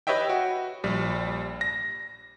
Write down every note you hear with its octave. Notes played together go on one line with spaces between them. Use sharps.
G4 B4 C#5 D#5 E5 G5
F#4
A#1 G3
A#6